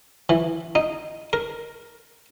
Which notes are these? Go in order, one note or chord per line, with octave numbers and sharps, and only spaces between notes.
E3
D#4
A#4